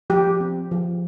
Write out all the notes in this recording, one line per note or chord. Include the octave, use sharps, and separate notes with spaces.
F3 G4
C4
F3